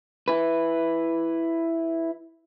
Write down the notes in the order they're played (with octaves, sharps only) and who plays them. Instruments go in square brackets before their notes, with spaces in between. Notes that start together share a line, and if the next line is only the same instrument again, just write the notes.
[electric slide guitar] E4 B4